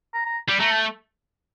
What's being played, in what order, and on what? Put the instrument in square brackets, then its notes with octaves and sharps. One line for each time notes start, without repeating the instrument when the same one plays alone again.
[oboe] A#5
A#5
[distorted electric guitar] G3
[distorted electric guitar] A3 [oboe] A#5
[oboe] A5